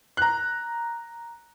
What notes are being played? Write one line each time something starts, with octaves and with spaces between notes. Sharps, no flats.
A#5 F#6